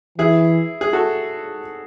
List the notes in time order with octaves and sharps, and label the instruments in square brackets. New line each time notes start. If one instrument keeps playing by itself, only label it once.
[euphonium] E3 [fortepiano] E4 G#4
[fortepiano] G#4
F#4 A4